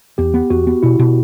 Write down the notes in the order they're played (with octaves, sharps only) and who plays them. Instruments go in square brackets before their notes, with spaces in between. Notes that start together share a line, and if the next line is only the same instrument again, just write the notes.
[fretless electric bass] E2 [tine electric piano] G4
[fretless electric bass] B3
[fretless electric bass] E2 [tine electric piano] F#4
[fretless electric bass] B3
[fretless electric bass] B2 [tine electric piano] E4
[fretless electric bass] B2